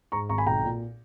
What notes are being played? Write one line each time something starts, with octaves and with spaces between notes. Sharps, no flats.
G#2 A#5 C#6
G#1 A#5 C#6
G#5 B5
B1 G5 A#5
A#2